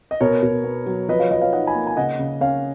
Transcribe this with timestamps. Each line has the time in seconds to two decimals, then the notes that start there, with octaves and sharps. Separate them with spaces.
0.11 D#5
0.21 B2 A#4 C#5
0.43 B2
0.64 B3
0.86 F#3
1.09 F3 B4 D#5
1.19 C#5 F5
1.31 F3 B4 D#5
1.41 C#5 F5
1.52 D#4 D#5 F#5
1.67 G#5 B5
1.75 A#3
1.87 G#5
1.97 C#3 D#5 F#5
2.19 C#3
2.41 C#4 C#5 F5